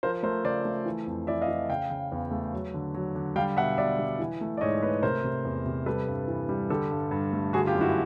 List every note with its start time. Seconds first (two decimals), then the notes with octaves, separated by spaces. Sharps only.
0.03 F3 A#4 C5
0.23 A3 A#4 C5
0.44 C#3 C5 D5
0.65 A3
0.85 E3
1.07 F2
1.27 E3 D5 E5
1.42 D#5 F5
1.48 E3
1.69 C#3 F5 G5
1.90 C#3
2.12 E2
2.31 A3
2.53 F#3
2.74 D3
2.94 F#3
3.15 D3
3.36 G3 F5 G5
3.57 B2 E5 F#5
3.78 B2 D5 E5
3.99 G3
4.19 E3
4.41 A3
4.57 D5
4.61 G#2 C#5 D#5
4.82 A3 B4 C#5
5.03 C3 A#4 C5
5.24 C3
5.45 E2
5.66 C3
5.86 G3 A4 B4
6.07 G2
6.28 E3
6.49 G3
6.70 D3 G4 A4
6.91 G2
7.11 G2
7.33 A3
7.53 D3 F#4 G#4
7.67 F4 G4
7.74 F#2
7.81 E4 F#4